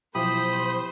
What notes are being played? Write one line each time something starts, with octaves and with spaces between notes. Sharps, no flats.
B2 F3 F#3 E4 G4 C5 B5 D#6